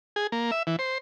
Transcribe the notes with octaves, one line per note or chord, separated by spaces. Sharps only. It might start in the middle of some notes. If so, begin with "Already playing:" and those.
G#4
A#3
E5
E3
C5